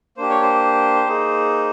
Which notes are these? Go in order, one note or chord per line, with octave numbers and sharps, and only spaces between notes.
A#3 D4 G4 C5
C#5
C5
A#3 D#4 G#4